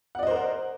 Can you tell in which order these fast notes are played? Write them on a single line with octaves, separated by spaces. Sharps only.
F#5 D5 D#5 C5 A#4